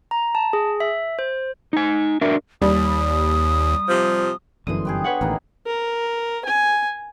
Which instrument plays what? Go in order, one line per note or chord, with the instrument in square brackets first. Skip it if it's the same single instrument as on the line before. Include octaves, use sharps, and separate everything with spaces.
[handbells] A#5
A5
G#4
E5
C5
[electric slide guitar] D#4 G#5
D4 F#4 A#4 E5
[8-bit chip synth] D#2 [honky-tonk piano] G3 [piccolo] D#6
[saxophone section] C3 F3
[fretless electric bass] G1 F#2 E3 [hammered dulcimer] D3 C6 [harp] D#6 D#7
[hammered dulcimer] B3 G4 G#4
[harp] B4 C#5 F#5
[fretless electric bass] A1 D#3 [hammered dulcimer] A#3 B3 D#4
[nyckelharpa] A#4
G#5